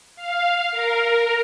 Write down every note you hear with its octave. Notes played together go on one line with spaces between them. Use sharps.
F5
A#4